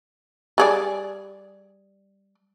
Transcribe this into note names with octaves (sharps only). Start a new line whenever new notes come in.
G3 G#4 D5